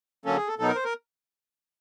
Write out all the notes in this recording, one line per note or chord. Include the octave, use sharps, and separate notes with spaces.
D3 F#3 A#3 C#4 A4
G#4
A4
B2 F#3 B3 D#4 A4
A#4
C5
A#4